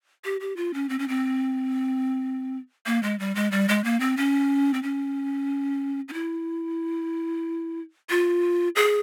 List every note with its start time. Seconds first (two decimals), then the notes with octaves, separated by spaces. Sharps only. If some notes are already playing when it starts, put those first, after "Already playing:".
0.25 G4
0.41 G4
0.57 F4
0.74 C#4
0.89 C4
0.99 C#4
1.08 C4
2.86 A#3
3.03 G#3
3.19 G3
3.35 G#3
3.52 G3
3.69 G#3
3.84 A#3
4.00 C4
4.17 C#4
4.74 C4
4.83 C#4
6.09 C#4
6.13 E4
8.10 F4
8.76 G#4